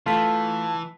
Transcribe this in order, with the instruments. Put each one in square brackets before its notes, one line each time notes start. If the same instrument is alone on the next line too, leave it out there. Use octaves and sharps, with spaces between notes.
[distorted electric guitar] E3 [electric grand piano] A3 B6 [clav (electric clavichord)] F4 [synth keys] A5